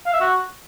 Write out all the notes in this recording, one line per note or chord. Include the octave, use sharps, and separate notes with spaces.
F5
E5
F#4